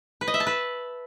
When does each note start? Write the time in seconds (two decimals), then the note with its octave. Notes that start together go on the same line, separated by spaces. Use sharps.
0.21 B4
0.28 D#5
0.34 E5
0.40 A5
0.47 B4